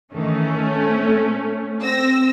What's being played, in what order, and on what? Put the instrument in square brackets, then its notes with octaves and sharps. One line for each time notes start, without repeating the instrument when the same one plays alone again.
[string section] D#3 E3 [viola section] A3 C#4
[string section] A#2 C4
C4 E6 A#6